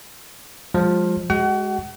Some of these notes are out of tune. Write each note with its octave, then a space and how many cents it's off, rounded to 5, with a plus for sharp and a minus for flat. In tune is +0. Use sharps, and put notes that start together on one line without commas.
F3 +20 G#3 -30
G#3 +0 F#4 +30 F#5 +40